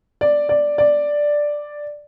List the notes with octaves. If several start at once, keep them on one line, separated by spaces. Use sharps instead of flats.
D5
D5
D5